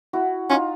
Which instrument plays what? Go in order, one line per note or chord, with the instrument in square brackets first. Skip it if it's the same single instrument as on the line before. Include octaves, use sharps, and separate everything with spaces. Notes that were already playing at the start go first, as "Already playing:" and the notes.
[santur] E4 F#4
[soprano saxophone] C#4 [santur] D#4 F4